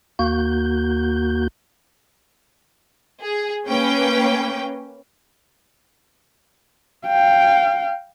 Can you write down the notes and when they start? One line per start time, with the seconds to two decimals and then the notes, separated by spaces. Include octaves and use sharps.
0.19 D#2 A#3 F#4 G6
3.22 G#4
3.68 A#3 C#4 B4 G5
7.07 F5 G5